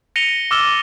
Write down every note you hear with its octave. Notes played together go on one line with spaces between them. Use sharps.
A#6 C#7 D#7 F7 G7
D6 E6 F6 A6 E7 G7